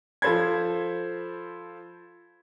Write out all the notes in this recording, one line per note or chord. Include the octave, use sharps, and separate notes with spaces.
F3 A4 C5 B5 G#6